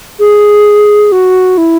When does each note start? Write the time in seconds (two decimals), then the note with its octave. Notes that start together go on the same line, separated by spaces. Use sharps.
0.20 G#4
1.12 F#4
1.58 E4